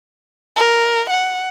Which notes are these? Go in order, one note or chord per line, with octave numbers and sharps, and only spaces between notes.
A#4
F#5